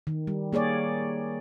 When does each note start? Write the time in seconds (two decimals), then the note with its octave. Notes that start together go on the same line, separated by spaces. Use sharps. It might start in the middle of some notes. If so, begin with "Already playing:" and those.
0.07 D#3
0.27 G3
0.53 A#3 G#4 C#5 D5